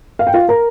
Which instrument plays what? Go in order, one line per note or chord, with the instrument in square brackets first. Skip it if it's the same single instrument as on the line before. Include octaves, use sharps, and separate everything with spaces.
[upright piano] F5
G5
F4 F5
A#4 A#5